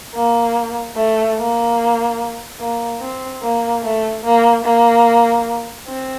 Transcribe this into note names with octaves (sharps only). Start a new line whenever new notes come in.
A#3
A3
A#3
A#3
C4
A#3
A3
A#3
A#3
C4